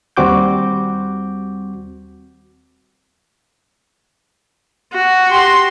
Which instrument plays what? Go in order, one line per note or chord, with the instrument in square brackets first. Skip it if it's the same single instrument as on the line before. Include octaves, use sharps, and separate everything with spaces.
[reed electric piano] D#2 G3 C4 F#4 D6 G6
[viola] F#4
[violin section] G4 C6